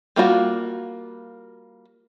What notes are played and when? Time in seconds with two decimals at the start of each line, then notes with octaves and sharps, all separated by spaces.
0.16 G3 A#3 F4 F#4